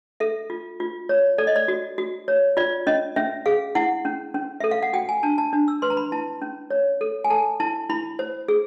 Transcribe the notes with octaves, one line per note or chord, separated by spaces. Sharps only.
A4 E5
F4
F4
C#5
A4 D5
D#5
D5
F#4
F#4
C#5
F4 D5
C#4 D#5
C#4 E5
G#4 F5
E4 F#5
C#4
C#4
A4 E5
F5
F#5
F#4 G5
G#5
D4 A5
A5
D4
E6
B4 C6
A#5
B5
E4 A5
C#4
C#5
A4
G#5
A4 A5
E4 A5
E4 B5
C5
G#4